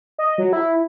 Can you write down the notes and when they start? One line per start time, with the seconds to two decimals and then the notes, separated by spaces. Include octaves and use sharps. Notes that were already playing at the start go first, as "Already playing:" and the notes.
0.19 D#5
0.38 F#3
0.53 E4